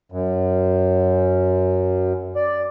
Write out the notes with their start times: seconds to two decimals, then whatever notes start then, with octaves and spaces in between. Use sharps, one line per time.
0.12 F#2
2.36 D5